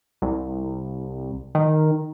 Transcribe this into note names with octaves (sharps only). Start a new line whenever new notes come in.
C2
D#3